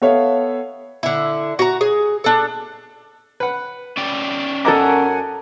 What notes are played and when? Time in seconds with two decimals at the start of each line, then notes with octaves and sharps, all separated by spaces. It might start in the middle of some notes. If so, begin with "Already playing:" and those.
0.02 B3 A4 C#5 E5 F5
1.03 D3 E4
1.59 F#4 A#5
1.81 G#4
2.24 D4 A4
3.40 B4 F#5
3.97 C#4 D5 G5
4.65 F#2 A4 A#4 D#5 F#5 G#5 A#5 D6